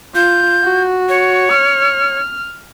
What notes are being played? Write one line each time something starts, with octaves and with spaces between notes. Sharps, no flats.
F4 G6
F#4
C#5
F6